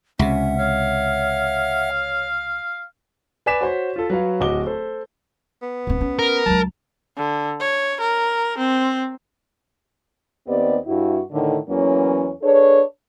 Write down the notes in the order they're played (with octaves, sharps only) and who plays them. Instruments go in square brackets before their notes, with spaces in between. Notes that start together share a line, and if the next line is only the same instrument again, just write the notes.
[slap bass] C#2 C3 [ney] C#4 [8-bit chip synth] E5 F#5
[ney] C#5 [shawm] F5
[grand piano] B4 D5 G#5 D6 B6 E7
F#4 C5 C#5
F4 A4
F#3 B4 C#5 F5
D1 F#4 D#5 D6 G7
A4 C5
[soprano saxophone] B3
[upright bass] D1 C4
C#4
[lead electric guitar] A#4
[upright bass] C#2 F#3 [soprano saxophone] A5
[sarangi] D3
C#5
A#4
C4
[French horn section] D#2 B3 C4 G4 D5 D#5
G2 E4 F#4
A2 D3 D#3
E2 E3 F#3 A#3 C#4 C#5
D4 G#4 A4 B4 C#5